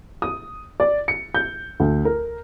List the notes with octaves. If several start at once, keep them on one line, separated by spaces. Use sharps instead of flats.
D#6
D5
C#7
G6
D2
A#4